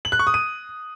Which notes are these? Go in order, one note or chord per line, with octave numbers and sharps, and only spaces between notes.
F#7
F#6
C#6
D#6
D#7